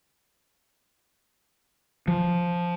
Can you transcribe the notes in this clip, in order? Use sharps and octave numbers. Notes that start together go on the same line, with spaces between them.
F3